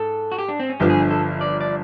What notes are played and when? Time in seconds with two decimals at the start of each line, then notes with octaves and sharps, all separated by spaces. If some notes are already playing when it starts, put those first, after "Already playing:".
Already playing: G#2 A4
0.32 F#4
0.38 G4
0.48 D4
0.60 C4
0.70 C#4
0.80 G1 G2 D3 F3 G4
0.90 G#4
1.10 A4
1.41 D5
1.61 D5